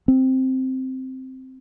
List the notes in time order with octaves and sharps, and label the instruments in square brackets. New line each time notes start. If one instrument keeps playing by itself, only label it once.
[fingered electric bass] C4